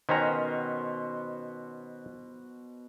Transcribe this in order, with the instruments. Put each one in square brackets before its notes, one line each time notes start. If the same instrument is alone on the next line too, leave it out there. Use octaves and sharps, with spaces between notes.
[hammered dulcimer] B2 [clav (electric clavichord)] D#3 C#4 A#5 [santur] C5 C#5